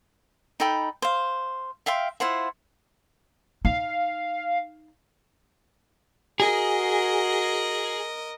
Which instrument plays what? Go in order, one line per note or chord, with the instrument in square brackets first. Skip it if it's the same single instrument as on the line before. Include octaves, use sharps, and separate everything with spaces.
[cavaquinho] D#4 A4 G5 B5
C5 F5
E5 F5 G5 C6
E4 F4 C5 F#5
[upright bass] D#4 [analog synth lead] F5
[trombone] F#4 [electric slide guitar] G#4 [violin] A#4 D#5